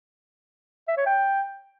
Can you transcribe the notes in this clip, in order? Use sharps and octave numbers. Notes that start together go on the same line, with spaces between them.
E5
C#5
G5